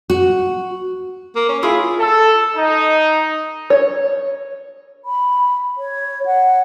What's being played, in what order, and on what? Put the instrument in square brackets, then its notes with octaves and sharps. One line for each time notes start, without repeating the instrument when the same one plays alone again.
[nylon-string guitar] F#4
[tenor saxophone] A#3
C#4
[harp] E4 F4 [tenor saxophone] G#4
[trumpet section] A4
D#4
[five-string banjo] C#5
[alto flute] B5
C#5
F#5